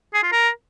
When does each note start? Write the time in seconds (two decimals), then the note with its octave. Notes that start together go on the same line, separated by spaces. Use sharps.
0.14 G#4
0.23 F4
0.32 A#4